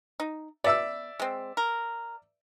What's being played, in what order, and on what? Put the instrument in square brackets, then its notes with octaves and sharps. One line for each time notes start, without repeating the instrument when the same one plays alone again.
[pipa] D#4
[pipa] B3 [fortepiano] D5 E5 E6
[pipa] G#3 C4
A#4